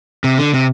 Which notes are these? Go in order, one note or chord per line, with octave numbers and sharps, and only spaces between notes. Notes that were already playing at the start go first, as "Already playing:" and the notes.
C3
D3
C3